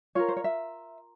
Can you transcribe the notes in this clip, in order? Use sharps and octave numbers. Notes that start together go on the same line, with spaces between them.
F4 A#4 C#5
C5
C#5
E5